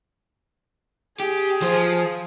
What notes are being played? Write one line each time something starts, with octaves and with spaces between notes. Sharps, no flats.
G4 G#4
F3 C5